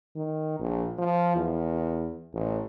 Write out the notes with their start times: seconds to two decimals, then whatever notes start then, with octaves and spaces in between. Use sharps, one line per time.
0.16 D#3
0.60 A#1
0.98 F3
1.36 E2
2.33 A1